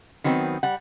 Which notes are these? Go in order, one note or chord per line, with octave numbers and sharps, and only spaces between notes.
D#3 F#3 B3 C4
G3 F#5